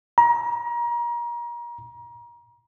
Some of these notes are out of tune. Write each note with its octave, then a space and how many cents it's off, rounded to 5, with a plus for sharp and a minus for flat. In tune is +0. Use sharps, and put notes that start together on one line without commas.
A#5 +30